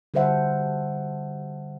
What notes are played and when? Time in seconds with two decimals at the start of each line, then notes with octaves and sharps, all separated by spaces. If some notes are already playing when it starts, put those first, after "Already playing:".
0.14 D3 G3 A4 C5 E5 F#5